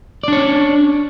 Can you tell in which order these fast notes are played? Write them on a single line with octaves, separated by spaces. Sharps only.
D5 D4 C#5 C#4